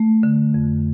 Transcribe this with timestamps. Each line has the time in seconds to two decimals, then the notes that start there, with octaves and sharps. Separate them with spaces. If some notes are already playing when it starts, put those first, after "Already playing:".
Already playing: A3
0.23 D3
0.54 F2